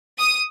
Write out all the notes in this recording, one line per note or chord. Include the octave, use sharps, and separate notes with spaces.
D#6